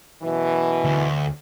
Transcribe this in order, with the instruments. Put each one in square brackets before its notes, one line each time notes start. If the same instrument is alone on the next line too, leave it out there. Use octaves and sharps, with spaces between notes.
[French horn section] F#2 B2 E3
[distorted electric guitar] D2